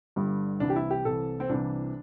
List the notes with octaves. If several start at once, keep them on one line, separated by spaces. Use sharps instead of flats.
G1 G2 D3 G3
C2 C3 E3 D4
G4
E4
G4
C2 C3 E3 A4
C4
C2 C3 E3 D4